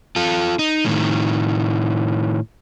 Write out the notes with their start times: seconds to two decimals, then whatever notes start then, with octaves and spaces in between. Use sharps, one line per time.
0.16 F4 A4
0.59 D#4
0.85 A2 D#3